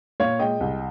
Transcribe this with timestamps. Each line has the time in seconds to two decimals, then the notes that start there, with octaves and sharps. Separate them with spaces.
0.20 A#2 C#5 F5
0.39 G#3 D#5 G5
0.61 C2